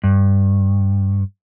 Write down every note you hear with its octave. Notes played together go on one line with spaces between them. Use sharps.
G2